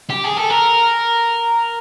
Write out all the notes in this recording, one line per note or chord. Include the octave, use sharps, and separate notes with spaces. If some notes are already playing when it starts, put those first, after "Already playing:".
G4
G#4
A4
A#4